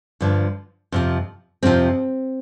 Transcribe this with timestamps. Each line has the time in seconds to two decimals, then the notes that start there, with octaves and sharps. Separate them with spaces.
0.21 G2 D3 F3
0.92 F2 C3 F3
1.63 F2 C3 F3 C4